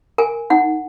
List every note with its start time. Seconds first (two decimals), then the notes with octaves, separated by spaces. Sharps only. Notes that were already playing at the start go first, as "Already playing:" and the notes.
0.18 A#4 G#5
0.50 D#4 F#5